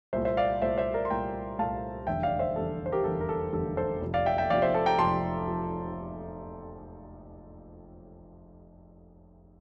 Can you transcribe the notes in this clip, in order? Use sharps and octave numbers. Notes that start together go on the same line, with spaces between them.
C2 A#2 A3 C5 E5
C5 E5
D5 F5
C2 A#2 A3 C5 E5
C5 E5
A#4 D5
C6
C2 A#2 A3 G5 A#5
C2 A#2 A3 F5 A5
F1 E2 D3 G3 E5 G5
D5 F5
C5 E5
F1 E2 D3 G3 A4
C5
G4 A#4
F1 E2 D3 G3 A4
A#4
A4
F1 E2 D3 G3 A4
A4 C5
F1 F2 C3 F3
D5 F5
E5 G5
E5 G5
F1 F2 C3 F3 D5 F5
C5 E5
A4 C5
G5 A#5
F1 F2 C3 F3 A5 C6
F3